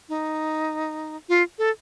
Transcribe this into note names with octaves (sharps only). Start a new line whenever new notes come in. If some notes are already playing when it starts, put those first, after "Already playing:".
D#4
F4
A4